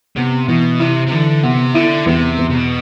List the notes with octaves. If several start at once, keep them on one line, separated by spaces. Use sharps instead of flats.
C3 B3
B2 E3
C3 E4
C3
D3 E3
C3 B3
D3 E4
E2 C3
E2
C3
B2